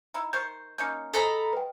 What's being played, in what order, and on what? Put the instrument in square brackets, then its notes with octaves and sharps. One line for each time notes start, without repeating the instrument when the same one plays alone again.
[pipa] D#4 E4
[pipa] D#3 C5 C#6 [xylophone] G6
[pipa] A#3 C#4 D#4 [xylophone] G6 C#7
[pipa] G#4 C5 D#5 [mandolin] A4 A#5 B5
[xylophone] B4 G5